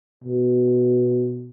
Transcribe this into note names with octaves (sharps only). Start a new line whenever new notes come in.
B2